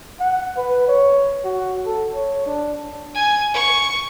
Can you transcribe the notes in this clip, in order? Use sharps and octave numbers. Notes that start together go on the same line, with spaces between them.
F#5
B4
C#5
F#4
A4
C#5
D4
G#5
C#6